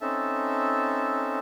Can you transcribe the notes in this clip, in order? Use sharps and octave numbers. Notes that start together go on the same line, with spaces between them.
C4 C#4 D#4 A4 E5 A5